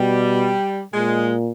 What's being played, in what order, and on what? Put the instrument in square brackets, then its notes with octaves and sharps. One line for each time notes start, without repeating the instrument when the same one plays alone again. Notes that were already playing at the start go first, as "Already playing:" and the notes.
Already playing: [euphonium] B2 [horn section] G3
[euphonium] A#2 [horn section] G#3